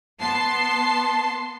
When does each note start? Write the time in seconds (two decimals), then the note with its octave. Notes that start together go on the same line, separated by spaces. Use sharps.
0.20 B3 A5 C6 C7